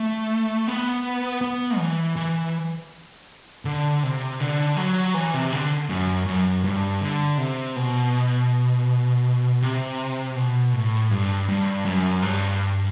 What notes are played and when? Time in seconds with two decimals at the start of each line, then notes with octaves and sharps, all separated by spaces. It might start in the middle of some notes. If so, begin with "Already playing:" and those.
Already playing: A3
0.68 B3
1.41 B3
1.78 E3
2.16 E3
3.65 D3
4.03 C3
4.40 D3
4.77 F#3
5.14 E3
5.34 C3
5.52 D3
5.89 F#2
6.26 F#2
6.64 G2
7.01 D3
7.37 C3
7.76 B2
9.62 C3
10.36 B2
10.73 A2
11.11 G2
11.49 G2
11.85 F#2
12.22 G2